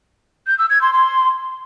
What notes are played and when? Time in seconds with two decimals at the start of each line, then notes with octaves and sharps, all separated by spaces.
0.47 G6
0.59 E6
0.70 G#6
0.82 C6
0.93 C6